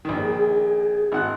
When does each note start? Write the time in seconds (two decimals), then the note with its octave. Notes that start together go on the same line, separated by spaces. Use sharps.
0.05 A#1 D#3
0.19 G#4
1.12 G#1 F#5 F#6